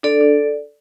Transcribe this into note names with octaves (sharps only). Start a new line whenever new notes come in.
D4 A4 D5
D4